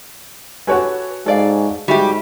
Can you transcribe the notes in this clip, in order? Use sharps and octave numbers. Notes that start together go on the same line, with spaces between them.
F#4 G4 A4 B4 C#5 G#5
G#2 A4 D5 F5
G#2 G3 F#4 G4 E5